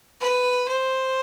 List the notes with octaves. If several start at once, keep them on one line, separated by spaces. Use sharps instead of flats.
B4
C5